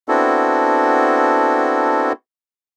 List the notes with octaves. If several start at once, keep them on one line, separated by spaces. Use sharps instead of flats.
B3 C4 D4 E4 F#4 A4